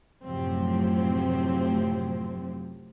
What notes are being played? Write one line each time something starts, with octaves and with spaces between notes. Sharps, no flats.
F#2 A2 C3 F3 F#3 C4